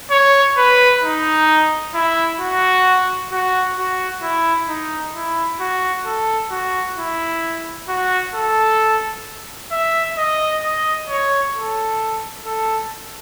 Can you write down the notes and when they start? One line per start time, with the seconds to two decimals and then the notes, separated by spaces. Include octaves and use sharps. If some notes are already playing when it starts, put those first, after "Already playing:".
0.11 C#5
0.57 B4
1.03 D#4
1.95 E4
2.40 F#4
3.32 F#4
3.78 F#4
4.23 E4
4.69 D#4
5.15 E4
5.61 F#4
6.06 A4
6.51 F#4
6.97 E4
7.89 F#4
8.34 A4
9.72 E5
10.18 D#5
10.64 D#5
11.09 C#5
11.55 A4
12.46 A4